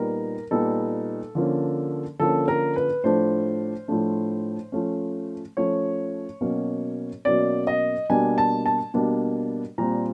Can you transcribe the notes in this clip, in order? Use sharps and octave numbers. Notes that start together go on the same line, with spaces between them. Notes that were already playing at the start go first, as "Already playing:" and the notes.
Already playing: A#2 G3 B3 D#4 A#4
A#2 G3 B3 D#4 A4
D3 F3 A#3 C#4
D3 F3 A#3 C#4 A4
A#4
B4
A2 F3 A3 D4 C5
A2 F3 A3 D4
F3 A3 C#4
F3 A3 C#4 C#5
B2 F#3 A#3 C#4
B2 F#3 A#3 C#4 D5
D#5
B2 G3 A#3 D4 G#5
A5
A5
B2 G3 A#3 D4
A#2 G3 C4 A#5